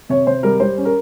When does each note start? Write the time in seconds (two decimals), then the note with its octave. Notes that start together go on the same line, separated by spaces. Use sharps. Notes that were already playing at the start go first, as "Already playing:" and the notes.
0.09 C3 C#5
0.27 C3 C5
0.43 G3 A#4
0.60 G3 C5
0.77 C#4
0.85 A#4